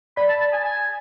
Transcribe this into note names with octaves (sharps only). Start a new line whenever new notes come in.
D5 B5
A5
A5
G#5
G#5